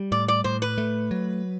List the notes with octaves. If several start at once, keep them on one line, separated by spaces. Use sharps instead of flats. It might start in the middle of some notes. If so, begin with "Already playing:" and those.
Already playing: G3
A2 D5
D5
A2 C5
B4
A3
F#3